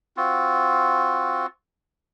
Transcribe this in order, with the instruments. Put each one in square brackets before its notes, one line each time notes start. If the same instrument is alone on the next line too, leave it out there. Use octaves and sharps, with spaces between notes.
[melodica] C4 F4 F#4